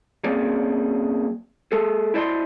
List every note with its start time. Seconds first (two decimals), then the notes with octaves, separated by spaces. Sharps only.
0.24 F#3 A#3 C4 C#4 G#4 D5
1.72 G#3 G#4 A4
2.14 E4 C5 D5 D#5 A5 C6